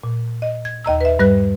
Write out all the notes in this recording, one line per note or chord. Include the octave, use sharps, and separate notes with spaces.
A#2
D#5
G#6
D#2 D#5 A#5 E6
B4 E5
G2 G3 B4 F#6